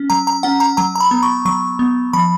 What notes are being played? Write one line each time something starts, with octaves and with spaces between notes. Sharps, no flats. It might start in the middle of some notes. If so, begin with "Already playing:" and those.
Already playing: C#4
F#3 A#5
A#5
C#4 F#5
A#5
F#3 A#5
A#5
B5
B3
C#6
F#3 C#6
B3
F3 B5